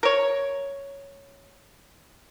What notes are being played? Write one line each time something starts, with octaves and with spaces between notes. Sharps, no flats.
A#4 C#5